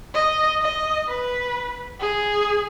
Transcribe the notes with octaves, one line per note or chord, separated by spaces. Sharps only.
D#5
D#5
B4
G#4